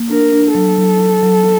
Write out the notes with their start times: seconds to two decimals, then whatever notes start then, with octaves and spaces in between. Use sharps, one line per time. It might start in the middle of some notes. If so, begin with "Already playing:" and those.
Already playing: A#3
0.10 D4 A#4
0.33 D4
0.54 F#3 A4
0.78 F#3
1.00 F#3
1.23 F#3